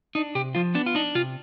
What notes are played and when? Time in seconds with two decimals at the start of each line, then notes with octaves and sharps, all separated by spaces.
0.15 D4 D#4
0.35 C3 G4
0.55 F3 F4
0.75 B3 D4
0.86 F4
0.95 D4 D#4
1.15 C3 F4